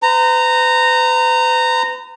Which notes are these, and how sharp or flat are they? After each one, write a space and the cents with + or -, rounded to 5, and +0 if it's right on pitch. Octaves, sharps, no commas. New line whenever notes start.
B4 +45 A#5 -15